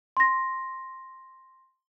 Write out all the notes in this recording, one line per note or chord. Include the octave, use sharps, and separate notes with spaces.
C6 A#6